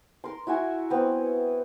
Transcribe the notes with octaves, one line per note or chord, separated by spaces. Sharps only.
A#4 C6
E4 F#4 E5 G#5
B3 C4